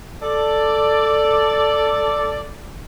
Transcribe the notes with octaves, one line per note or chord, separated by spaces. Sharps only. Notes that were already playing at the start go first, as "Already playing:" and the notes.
A4 D5